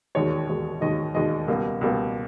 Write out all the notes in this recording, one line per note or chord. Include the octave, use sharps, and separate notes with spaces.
E1 D#2 D#3 G#3 C#5
E1 D#2 D#3 G#3
E1 D#2 D#3 G#3 D#5
E1 D#2 D#3 G#3 D#5
C#2 B2 G3 A#3
C#2 B2 G3 A#3